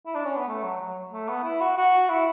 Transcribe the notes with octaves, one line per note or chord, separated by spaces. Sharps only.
E4
D4
C#4
B3
A3
F#3
F#3
A3
B3
E4
F#4
F#4
E4